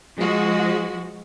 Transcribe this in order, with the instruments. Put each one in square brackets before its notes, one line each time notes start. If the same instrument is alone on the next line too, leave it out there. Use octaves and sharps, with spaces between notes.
[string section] F3 G#3 F#4